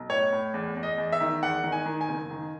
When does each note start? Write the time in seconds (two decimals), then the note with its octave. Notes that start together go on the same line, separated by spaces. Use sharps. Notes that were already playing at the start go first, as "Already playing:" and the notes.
Already playing: B1
0.10 A2 C#5
0.32 A2
0.54 E2
0.77 E2
0.83 D#5
0.98 E2
1.12 E5
1.21 D#3
1.42 E2 F#5
1.64 D#3
1.72 G#5
1.86 D#3
2.01 G#5
2.09 F#1
2.31 D#3